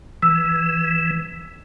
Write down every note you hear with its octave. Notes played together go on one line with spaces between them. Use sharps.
E3 E6